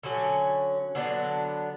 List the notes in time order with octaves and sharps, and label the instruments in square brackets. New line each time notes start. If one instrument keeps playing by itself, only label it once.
[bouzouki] D3 F#3 C#4
D3 F#3 B3 D4